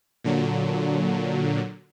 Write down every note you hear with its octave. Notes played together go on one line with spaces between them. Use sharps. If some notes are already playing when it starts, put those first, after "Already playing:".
A#2 D3 F#3